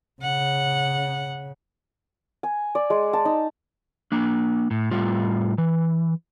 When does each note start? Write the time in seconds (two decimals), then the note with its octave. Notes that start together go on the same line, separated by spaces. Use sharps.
0.22 C#3 F#5
2.43 G#5
2.75 D5
2.90 G#3
3.13 A5
3.25 D#4
4.12 A#3 D4
4.71 A2
4.91 A2 G3 F4
5.58 E3